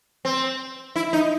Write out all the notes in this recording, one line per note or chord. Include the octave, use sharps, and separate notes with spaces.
C4
E4
D#4